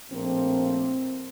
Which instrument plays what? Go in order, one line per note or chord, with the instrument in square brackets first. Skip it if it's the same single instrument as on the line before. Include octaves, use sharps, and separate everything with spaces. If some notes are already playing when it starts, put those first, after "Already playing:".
[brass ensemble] A#1 A2 F3 A#3 C4